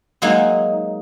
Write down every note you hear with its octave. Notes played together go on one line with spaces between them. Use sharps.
F#3 G#3 A#3 D#4